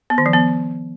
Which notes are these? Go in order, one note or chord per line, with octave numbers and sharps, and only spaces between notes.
B3
D#3
F3
B3